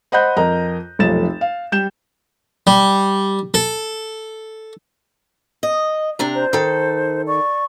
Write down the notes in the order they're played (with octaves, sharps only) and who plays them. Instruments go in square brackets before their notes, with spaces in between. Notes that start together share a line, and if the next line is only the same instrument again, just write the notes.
[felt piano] C5 D#5 F#5 B5 F#6 G6
F2 A#4 D#5 A#5
F1 B1 F3 A4 A6 E7
F5
G3 G6 E7
[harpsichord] G3
A4
[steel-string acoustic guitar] D#5
C3 D4 A#5
[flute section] C5
[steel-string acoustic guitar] D#3 A4
[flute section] D5 C#6